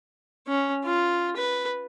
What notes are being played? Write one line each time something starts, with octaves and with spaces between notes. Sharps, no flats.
C#4
F4
B4